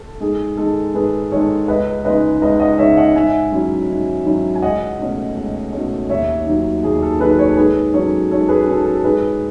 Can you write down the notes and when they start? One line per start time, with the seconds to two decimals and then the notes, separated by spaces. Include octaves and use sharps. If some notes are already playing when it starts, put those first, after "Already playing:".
Already playing: A4
0.21 G#2 G#4
0.57 D#3 G#3 A4
0.94 G#2 G#4 B4
1.32 D#3 G#3 A4 C#5
1.68 C#2 B4 D#5
2.05 C#3 G#3 D#4 B4 D#5
2.42 C#2 B4 D#5
2.60 D#5 F#5
2.78 C#3 G#3 D#4 C#5 E5
2.97 D#5 F#5
3.15 G#2 E5 G#5
3.52 D#3 F#3 C#4 E4
3.90 G#2
4.25 D#3 F#3 C#4 E4
4.55 G#5
4.62 C#2 D#5 F#5
4.99 B2 A3 C#4
5.36 C#2
5.73 B2 A3 C#4
6.09 D#2 C#5 E5
6.46 D#3 F#3
6.83 D#2 G#4
7.03 A4
7.20 D#3 F#3 G#4 B4
7.39 A4 C#5
7.57 G#2 G#4 B4
7.94 F#3 C#4 A4 C#5
8.31 G#2 A4 C#5
8.49 G#4 B4
8.67 F#3 C#4 A4
8.86 A4
9.04 G#2 G#4 B4